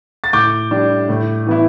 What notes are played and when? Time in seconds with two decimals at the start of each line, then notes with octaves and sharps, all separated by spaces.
0.24 A6
0.33 A2 D6 G6
0.71 G3 D4
1.09 A2
1.46 E3 B3 E4